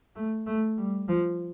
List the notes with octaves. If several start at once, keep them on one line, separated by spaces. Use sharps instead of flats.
A3
A3
G3
F3